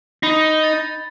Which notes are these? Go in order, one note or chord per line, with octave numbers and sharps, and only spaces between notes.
D#4 B5
A6